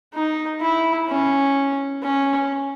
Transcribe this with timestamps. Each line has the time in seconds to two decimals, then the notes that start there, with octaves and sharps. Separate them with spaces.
0.14 D#4
0.61 E4
1.09 C#4
2.02 C#4